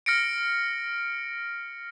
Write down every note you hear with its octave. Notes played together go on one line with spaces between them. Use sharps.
F6 A#6 C#7 D7